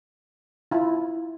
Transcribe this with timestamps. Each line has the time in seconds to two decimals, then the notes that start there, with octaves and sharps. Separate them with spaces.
0.71 E4 F4